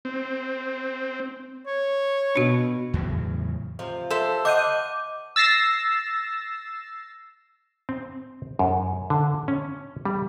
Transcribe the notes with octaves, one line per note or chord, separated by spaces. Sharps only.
C4
C#5
B2 D4 F#4
E2 A2 C#3 F#3
C3 F3 F4
A4 C5 E5
D#5 F#5 D6 G6 D#7
E6 A6 A#6 C7 E7
C4
F#2
D3
C#4
G3